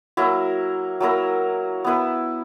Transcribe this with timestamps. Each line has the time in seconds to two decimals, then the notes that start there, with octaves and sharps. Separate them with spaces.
0.17 F#3 A#3 E4 A#4
1.00 F#3 A#3 E4 A#4
1.84 B3 E4 B4